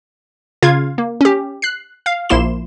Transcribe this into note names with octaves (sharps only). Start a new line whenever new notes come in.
C#3 F4 F5 G#6
A#3
C#4 G4
F#6 C7
F5
A#1 F3 A#3 E4 C6 E7